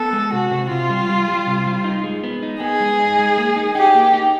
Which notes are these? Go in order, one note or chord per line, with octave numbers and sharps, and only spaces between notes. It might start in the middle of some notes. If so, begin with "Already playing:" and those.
Already playing: B3 A4
G#3
C3 F#4
C3
C3 F4
G3
G3
G3
C3
G3
D#4
G#3
B3
D#4
B3 G#4
G#3
D#4
G#3
A#3
D#4
D#4 G4
A#3
D#4